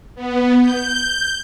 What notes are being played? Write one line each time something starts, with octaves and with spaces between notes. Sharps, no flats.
B3
G6